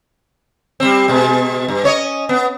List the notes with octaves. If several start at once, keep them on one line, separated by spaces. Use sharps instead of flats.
G3 C4
B2 G#3
G2
C#4 C#5 D#5
B3